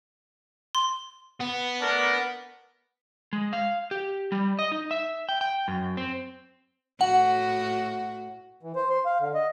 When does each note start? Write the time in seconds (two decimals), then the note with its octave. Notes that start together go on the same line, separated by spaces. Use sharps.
0.75 C6
1.40 B3
1.81 A3 D4 A#4
3.33 G#3
3.53 F5
3.91 G4
4.32 G3
4.59 D#5
4.72 D#4
4.91 E5
5.29 G5
5.41 G5
5.68 F#2
5.97 C4
7.01 A2 F#4 F#5
8.63 E3
8.76 C5
8.91 C6
9.05 F5
9.20 D3
9.34 D#5